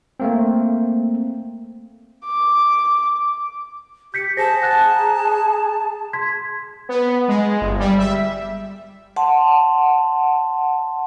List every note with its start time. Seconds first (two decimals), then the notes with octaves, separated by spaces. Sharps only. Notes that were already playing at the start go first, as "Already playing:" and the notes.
0.20 A3 A#3 C4
2.27 D6
4.14 G4 G6 B6 C#7
4.37 G#4 C5 A5 A#6
4.62 F#5 F#6 A6
4.95 A#5
6.13 C6 G#6 B6
6.89 B3
7.28 G#3
7.61 G1
7.79 G3
7.98 E5
9.16 F#5 A5 C6